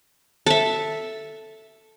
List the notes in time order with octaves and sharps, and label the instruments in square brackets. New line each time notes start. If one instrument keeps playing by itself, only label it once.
[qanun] A4 E5